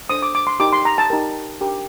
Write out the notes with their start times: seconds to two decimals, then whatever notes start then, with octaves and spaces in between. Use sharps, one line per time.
0.10 D4 A4 C5 D#6
0.22 D6
0.35 D6
0.47 C6
0.60 D#4 G4 A#4 D6
0.73 C6
0.85 A#5
0.98 A5
1.10 D#4 G4 A#4
1.61 D4 G4 A#4